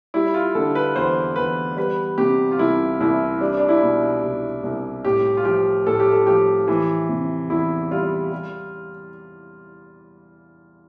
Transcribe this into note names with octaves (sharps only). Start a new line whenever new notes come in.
G3 E4
F4
D3 A4
B4
E2 C5
E2 B4
G3 B4
C3 G4
F4
C2 E4
C2 E4
G3 D4
D4
E4
B2
C2
C2
A2 G4
F4
F3 G4
A2 A4
G4
A4
F3 G4
E3
C3
E2 E4
G3 F4
G3